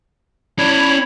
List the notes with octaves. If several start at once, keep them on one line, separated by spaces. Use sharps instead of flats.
C#4 E4 C#5 D5